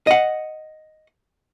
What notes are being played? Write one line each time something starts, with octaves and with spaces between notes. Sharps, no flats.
D#5 F#5